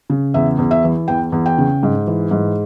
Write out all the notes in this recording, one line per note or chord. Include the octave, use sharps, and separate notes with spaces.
C#3
E2 E5
E2
E5
E3
E2 G5
E2
G5
C#3
G#2
E3
G#2